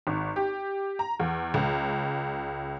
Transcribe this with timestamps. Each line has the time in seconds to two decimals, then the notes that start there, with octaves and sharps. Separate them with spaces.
0.07 G#1
0.36 G4
0.99 A#5
1.20 E2
1.54 C#2